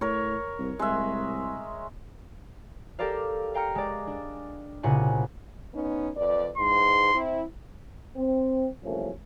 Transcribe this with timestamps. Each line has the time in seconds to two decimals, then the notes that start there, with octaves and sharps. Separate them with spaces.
0.01 A2 A#4 C#5
0.59 C2
0.79 C2 G#3 E5
2.99 G4 A4 A#4 D5 F5
3.54 F5 G5 A#5 F6 C#7
3.75 G#3 D5
4.07 D4
4.83 C2 A#2 C#3 F#5 G#5
5.74 B3 C#4 D#4
6.16 F2 B4 D5
6.57 E2 G#2 C6
7.13 C4 E4
8.16 C4
8.83 C2 F#2 F3 A3 A#3 C#4